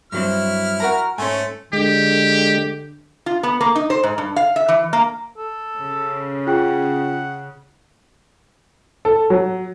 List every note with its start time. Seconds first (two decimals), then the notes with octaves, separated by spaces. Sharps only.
0.12 G2 F#3 C4 E4 F6
0.80 F#4 A#4 A#5
1.18 G#2 A3 C#4 G#5 C6
1.73 D3 G#3 G4
3.26 F4
3.43 B3
3.61 A#3
3.75 D#4
3.90 C5
4.03 G#2
4.18 G2
4.36 F5
4.56 E5
4.68 E3
4.93 A#3
5.37 A4
5.78 C#3
6.47 F4 G#4 F#5 G5
9.05 A4
9.30 F#3